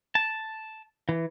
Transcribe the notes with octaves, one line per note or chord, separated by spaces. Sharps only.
A5
E3